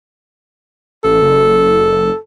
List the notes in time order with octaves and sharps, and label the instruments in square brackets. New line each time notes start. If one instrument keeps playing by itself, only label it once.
[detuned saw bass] A1 [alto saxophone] A4
[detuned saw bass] F#1